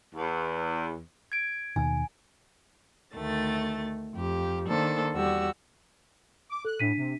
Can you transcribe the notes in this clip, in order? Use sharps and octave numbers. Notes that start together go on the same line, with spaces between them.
E2
G#6 D7
D#2 B2 D#3 G#5
D2 D#3 A3 A6
F2 G4
D#3 A#3 D4 A4 C5
E2 G3 F#4 E6
D6
A4 F#6
A2 D4 B6 D#7
C3